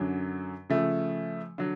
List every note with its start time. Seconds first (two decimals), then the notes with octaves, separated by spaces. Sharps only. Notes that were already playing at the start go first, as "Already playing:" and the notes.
Already playing: F#2 D3 F#3
0.70 C#3 F3 A3
1.58 D3 F#3